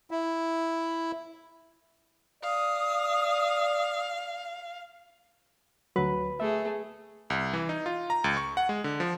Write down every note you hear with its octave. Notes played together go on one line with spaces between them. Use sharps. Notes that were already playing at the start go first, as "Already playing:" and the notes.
E4
D5 F5 D#6
D2 F#3 B4
A3 G#4 E5
C2
E3
D#4
F4
A#5
C#2
C#6
F#5
G#3
D3
F3